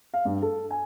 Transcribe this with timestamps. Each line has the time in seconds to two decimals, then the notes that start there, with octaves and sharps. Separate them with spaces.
0.14 F5
0.25 G2
0.42 A4
0.71 G#5